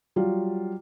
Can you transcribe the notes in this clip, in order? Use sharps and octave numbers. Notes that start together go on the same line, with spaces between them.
F#3 G3 F4